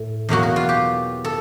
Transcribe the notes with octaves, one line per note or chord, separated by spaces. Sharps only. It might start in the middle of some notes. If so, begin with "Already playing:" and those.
Already playing: A2
E2 B2 F#3 A#3 F#4
F#4
F4
G4
A4